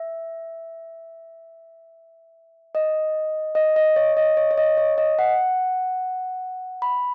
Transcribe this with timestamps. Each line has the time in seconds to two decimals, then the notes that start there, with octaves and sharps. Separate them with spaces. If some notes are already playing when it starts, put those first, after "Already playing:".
Already playing: E5
2.75 D#5
3.55 D#5
3.76 D#5
3.96 C#5
4.17 D#5
4.37 C#5
4.51 C#5
4.57 D#5
4.77 C#5
4.98 D#5
5.19 F#5
6.82 B5